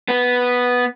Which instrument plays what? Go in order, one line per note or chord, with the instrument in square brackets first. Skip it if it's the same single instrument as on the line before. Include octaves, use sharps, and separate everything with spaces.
[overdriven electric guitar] B3